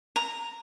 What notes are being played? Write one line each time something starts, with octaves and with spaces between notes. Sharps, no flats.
A#5